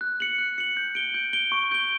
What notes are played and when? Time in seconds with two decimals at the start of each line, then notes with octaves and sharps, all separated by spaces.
0.01 F#6
0.20 C#7 F#7
0.38 F#6
0.58 C#7 F#7
0.77 G6
0.95 D7 G7
1.14 G6
1.33 D7 G7
1.52 C#6
1.71 G6 D7 G7